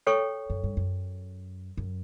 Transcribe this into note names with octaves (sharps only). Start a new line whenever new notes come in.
A4 C#5 G5 C#6
F#2
G2
F#2
F#2